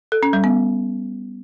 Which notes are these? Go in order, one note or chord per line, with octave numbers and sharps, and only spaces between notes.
A4
C#4
G3
B3